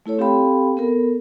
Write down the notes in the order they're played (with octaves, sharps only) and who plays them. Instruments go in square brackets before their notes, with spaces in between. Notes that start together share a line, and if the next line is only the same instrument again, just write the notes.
[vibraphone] A3 E4 A4 C#5
C4 G4 A4 F5 G5 B5
B3 A4 A#4